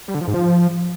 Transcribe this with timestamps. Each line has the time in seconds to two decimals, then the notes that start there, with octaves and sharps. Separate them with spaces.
0.08 G3
0.14 D3
0.21 F3
0.28 G#2
0.34 F3